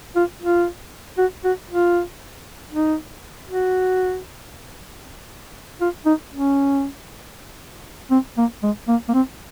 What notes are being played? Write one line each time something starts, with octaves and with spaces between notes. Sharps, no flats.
F4
F4
F#4
F#4
F4
D#4
F#4
F4
D#4
C#4
C4
A#3
G#3
A#3
A#3
C4